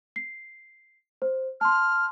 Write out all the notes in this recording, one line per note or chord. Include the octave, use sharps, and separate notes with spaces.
C7
C5
A5 C6 F6